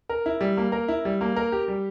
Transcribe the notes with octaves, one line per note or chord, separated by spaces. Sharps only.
A#4
E4
G3
A#3
A#4
E4
G3
A#3
A#4
G4
G3